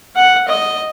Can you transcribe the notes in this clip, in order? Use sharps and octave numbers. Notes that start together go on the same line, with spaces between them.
F#5
D#5